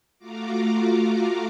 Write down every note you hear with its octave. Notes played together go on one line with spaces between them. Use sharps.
A3 F4 F#4 F5 A#5 D6